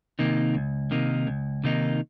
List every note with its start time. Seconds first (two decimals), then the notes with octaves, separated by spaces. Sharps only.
0.19 C3 D#3 A#3 D#4
0.54 C#2
0.91 C3 D#3 A#3 D#4
1.27 C#2
1.64 C3 D#3 A#3 D#4